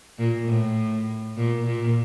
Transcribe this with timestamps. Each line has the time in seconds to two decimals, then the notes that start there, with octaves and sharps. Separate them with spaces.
0.18 A#2
0.48 A2
1.37 A#2
1.66 A#2